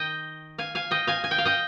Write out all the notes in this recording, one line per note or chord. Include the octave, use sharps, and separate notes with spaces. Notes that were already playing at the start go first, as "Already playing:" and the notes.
Already playing: D#3 D#5 G5
F5 G#5
F5 G#5
D#5 G5
F5 G#5
G#5
G5
F5
D#5 G5